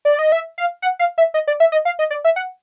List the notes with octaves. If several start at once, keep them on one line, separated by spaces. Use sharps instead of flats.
D5
D#5
E5
F5
F#5
F5
E5
D#5
D5
E5
D#5
F5
D#5
D5
E5
F#5